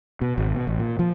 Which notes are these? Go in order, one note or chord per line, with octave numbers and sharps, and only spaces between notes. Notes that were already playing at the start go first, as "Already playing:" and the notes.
B2
G#1
B2
A1
A#2
F3